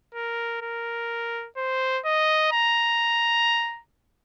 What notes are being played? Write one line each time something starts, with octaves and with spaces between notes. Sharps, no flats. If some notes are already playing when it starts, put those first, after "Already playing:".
A#4
A#4
C5
D#5
A#5